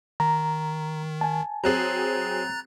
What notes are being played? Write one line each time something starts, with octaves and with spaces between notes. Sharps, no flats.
D#3 A#5
G#5 A5
F#3 C4 G#4 A#5 F#6 A6